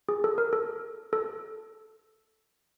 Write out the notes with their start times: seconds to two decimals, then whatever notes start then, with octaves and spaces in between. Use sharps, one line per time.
0.09 G#4
0.24 A4
0.38 A#4
0.53 A4
1.13 A4